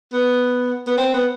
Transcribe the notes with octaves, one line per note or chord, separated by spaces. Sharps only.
B3
B3
C4
B3